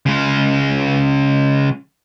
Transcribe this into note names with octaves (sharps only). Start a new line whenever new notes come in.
C#3 G#3